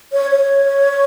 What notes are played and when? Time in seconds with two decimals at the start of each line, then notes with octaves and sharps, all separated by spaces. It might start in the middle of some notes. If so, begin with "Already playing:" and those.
0.13 C#5
0.32 C#5